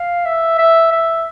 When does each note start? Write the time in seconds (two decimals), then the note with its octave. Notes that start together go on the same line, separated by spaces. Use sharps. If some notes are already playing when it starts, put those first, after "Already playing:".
Already playing: F5
0.25 E5
0.58 E5
0.92 E5